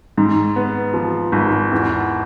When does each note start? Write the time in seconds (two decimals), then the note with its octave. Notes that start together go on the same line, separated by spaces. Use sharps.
0.17 G#2
0.56 B3
0.94 F3
1.32 G#1
1.72 E2